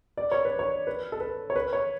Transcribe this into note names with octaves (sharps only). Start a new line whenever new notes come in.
D5
C#5
B4
C#5
B4
A4
B4
C#5
B4
C#5